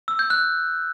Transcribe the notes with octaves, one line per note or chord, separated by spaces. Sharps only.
E6
G6
F#6